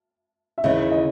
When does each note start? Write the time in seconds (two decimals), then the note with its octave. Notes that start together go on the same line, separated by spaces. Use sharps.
0.58 E5
0.64 D#2 C#3 E3 D#5
0.91 D#5